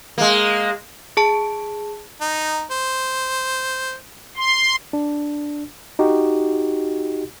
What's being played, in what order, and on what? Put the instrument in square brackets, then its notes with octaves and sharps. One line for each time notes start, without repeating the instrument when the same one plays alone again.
[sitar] G#3 A#3
[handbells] G#4 A5 D7
[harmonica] D#4
C5
[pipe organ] C6
[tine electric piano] D4
D#4 F#4 G4